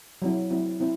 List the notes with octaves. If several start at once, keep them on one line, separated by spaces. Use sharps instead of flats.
F#3 C4 E4
F#3 C4 E4
C4 E4